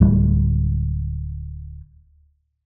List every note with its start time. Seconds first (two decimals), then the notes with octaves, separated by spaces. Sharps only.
0.01 D1 G3